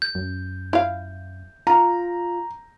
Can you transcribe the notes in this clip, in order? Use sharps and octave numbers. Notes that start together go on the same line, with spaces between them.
G6
F#2
E4 F5
F4 A#5